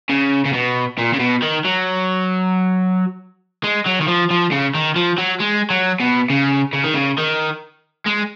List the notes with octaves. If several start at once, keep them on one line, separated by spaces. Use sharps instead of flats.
C#3
C#3
B2
A#2
C#3
B2
D#3
F#3
G#3
F#3
D#3
F3
F3
C#3
D#3
F3
F#3
G#3
F#3
B2
C#3
C#3
D#3
C#3
D#3
G#3